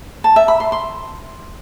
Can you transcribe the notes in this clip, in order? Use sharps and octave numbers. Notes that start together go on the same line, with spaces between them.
A5
E5
B5
C6
C6